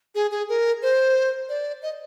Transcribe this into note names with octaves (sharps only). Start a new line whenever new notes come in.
G#4
G#4
A#4
C5
D5
D#5